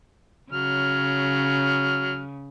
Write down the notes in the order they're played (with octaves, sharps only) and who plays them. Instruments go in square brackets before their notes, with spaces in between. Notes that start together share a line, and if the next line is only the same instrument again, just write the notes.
[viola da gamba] C#3 [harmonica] F#3 F6